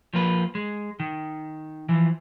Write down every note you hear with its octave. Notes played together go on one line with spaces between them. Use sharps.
F3 A#3 B4
G#3
D#3
E3 F3